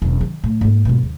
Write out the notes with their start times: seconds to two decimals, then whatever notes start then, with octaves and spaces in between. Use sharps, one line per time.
0.02 E1 F#2
0.21 D#3
0.44 A2
0.61 G#2 A#3
0.85 G#2 B2
1.03 D#2